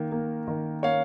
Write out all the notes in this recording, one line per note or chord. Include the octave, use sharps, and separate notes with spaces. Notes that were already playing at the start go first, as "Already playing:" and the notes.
Already playing: D#3 A#3
A#3
D#3
A#3 C#5 F5